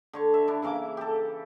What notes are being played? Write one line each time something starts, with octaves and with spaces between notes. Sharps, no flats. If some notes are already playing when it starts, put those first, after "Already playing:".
D3 C#5 C#6
E5
D4 E4
C#3 E3 A#3 D6
G4 A4